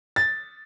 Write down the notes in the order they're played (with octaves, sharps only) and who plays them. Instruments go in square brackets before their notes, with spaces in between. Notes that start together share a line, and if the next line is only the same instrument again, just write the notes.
[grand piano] A6